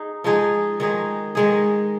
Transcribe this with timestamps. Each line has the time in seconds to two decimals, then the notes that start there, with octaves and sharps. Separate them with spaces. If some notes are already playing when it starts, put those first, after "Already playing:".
Already playing: D#4 G#4
0.24 F3 G#3 D#4 G#4
0.80 D#3 G#3 D#4 G#4
1.35 D#3 G#3 D#4 G#4